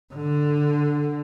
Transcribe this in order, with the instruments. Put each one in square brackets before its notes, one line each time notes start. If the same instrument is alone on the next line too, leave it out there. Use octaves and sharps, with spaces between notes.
[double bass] D3